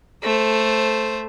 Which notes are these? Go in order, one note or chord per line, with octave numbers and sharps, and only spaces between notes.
A3 C5